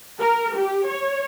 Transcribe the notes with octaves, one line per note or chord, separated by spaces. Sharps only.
A#4
G4
C#5